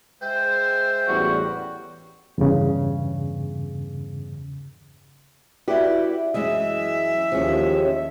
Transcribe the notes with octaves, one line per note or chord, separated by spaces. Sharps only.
G#3 C5 E5 G5
A1 E2 G3 F#4
E2 G2 C#3
E4 F#4 G4 B4 D5
F#2 E3 G#3 D#5 E5
D#2 F3 G#3 C#4